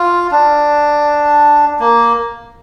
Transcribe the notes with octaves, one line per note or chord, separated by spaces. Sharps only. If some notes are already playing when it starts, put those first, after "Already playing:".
Already playing: F4
D4
A#3